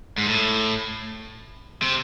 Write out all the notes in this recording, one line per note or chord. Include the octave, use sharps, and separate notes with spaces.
G#2
A2
C3